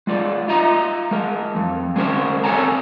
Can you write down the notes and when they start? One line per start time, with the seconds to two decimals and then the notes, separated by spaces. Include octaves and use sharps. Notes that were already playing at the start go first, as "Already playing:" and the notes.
0.07 G#3 F4 D5
0.48 F4 D#5 A#5
1.11 G#3 A#4
1.56 F2
1.96 G#3 C#4 A#4 C5
2.44 C4 A4 A#4 C#5 G#5 A#5